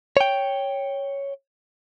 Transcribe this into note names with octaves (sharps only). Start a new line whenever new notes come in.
C#5 G5